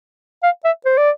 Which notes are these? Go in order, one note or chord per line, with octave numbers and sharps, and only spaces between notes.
F5
E5
C5
D5